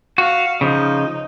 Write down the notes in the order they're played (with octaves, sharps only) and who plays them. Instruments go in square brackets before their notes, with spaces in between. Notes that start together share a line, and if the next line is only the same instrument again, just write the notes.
[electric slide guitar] F#4 [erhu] F5
[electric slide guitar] C#3 F3 [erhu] D#4